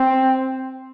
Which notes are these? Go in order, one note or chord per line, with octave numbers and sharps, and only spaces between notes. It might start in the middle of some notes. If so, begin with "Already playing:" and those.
Already playing: C4